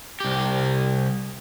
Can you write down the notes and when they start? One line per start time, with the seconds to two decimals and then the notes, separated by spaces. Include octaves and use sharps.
0.20 C2 G4